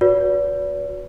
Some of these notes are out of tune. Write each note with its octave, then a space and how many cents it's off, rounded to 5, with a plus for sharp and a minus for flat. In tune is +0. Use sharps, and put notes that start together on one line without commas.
F#4 -20 B4 +0 D5 -45